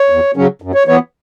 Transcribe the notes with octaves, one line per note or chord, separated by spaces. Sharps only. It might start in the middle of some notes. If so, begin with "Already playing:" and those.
Already playing: C#5
E2
C#3 F#3 C#4
F#2
C#5
E3 B3 C#5